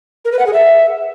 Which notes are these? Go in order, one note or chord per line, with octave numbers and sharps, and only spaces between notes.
A#4
B4
F#5
G#4
E5